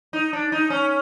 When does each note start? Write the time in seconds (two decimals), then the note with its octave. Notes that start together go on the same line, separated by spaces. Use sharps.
0.13 D#4
0.33 D4
0.52 D#4
0.70 C#4